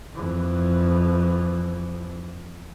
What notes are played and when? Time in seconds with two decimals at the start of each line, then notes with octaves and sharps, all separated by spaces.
0.14 F2 E3